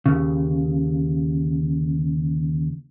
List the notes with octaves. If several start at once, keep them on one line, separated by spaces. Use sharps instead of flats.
D#2 C#3